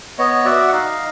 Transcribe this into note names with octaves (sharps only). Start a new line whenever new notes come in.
B3 C#5 D#5
F#4 D5 E5
F#5
D#4 D#5 F5